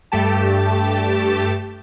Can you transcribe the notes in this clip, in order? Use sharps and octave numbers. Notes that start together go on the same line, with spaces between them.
G2 A3 G4 A5